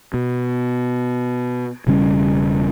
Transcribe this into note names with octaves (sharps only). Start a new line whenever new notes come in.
B2
E1 C#3 G3 C#4